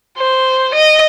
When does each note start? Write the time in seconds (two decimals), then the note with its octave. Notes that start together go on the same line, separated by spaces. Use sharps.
0.18 C5
0.74 D#5